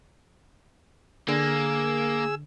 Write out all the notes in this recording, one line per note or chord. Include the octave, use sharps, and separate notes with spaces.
D3 A#3 G#4 E6